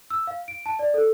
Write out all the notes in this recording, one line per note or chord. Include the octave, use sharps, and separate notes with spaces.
E6
F5
D7
A5
D5
A4